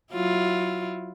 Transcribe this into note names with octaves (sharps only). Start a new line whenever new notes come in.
F#3 E4 F4